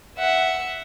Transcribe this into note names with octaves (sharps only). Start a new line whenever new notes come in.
E5 F#5